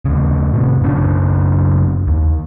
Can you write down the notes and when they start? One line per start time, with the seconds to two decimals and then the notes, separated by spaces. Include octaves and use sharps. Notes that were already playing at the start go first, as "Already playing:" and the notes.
0.05 D#2 C#3
0.53 A2 C3
0.82 F#2 C#3 D4
2.07 D#2